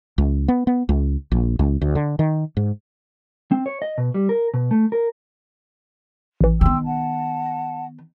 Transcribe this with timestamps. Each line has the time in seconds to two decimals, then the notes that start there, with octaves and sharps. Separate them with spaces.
0.18 C#2
0.48 B3
0.67 B3
0.89 C#2
1.31 A#1
1.59 C#2
1.81 D2
1.95 D3
2.19 D#3
2.57 G#2
3.52 C4
3.66 C#5
3.82 D#5
3.98 B2
4.14 G3
4.29 A#4
4.54 B2
4.71 A3
4.92 A#4
6.41 A1 E3
6.61 D#3 B3 G5 C6 E6
6.85 F#5 A5